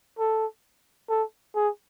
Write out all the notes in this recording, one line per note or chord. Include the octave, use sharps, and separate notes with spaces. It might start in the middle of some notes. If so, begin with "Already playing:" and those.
A4
A4
G#4